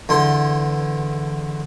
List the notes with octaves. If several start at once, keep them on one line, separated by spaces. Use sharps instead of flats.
E2 D3 C6